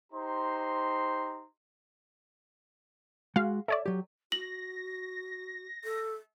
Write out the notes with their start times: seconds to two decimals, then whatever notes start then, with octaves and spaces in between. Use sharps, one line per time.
0.12 D#4 G4 C5 A#5 C6
3.36 G#3 F#4 F5
3.68 A4 C#5 D5 E5
3.86 F#3 G4
4.32 F#4 A#6 F#7
5.84 A4